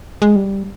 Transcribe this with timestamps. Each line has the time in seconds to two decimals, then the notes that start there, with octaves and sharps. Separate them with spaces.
0.22 G#3
0.36 G3